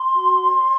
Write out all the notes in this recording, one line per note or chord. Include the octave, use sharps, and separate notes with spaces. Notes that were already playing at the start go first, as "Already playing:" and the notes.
Already playing: C6
F#4
C#5